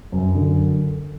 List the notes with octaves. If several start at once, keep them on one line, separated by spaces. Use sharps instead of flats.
F#2
D3